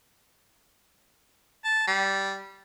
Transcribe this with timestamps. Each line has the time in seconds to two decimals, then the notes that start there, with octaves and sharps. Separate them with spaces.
1.65 A5
1.88 G3